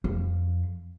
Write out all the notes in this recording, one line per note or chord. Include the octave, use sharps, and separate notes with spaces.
F2